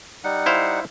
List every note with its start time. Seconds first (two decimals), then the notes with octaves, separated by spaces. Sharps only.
0.24 G3 D#4 F#5
0.46 E4 C5 F5